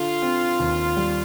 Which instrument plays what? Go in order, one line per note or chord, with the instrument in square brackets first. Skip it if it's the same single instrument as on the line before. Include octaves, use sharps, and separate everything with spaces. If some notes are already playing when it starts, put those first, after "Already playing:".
Already playing: [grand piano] D3 [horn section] F4
[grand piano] C4
D#2
G3